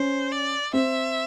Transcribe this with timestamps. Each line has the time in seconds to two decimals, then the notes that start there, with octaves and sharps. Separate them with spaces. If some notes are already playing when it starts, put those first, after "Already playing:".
Already playing: C#4 C5
0.32 D5
0.73 C4 E5